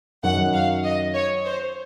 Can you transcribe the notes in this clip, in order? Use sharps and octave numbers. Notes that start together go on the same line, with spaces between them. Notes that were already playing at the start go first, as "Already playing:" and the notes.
F#2 D#3 F#3 F#5
F5
D#5
C#5
C5